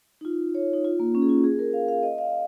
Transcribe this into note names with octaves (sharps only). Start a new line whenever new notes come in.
D#4
F4
C#5
D#4
F4
A#3
C#4
G#4
F4
G#4
A#4
F5
F5
D#5
F5